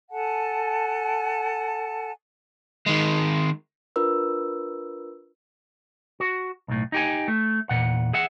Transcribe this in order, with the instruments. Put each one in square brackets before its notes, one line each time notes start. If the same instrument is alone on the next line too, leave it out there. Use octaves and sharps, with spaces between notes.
[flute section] A4 F#5 G#5 A5
[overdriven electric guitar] D#3 G#3
[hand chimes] D4 F4 A#4 B4 E6
[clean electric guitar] F#4
B1 A2
D#4 G4 G#5
A3
E2 A#2 F#5
G#4 E5 F#5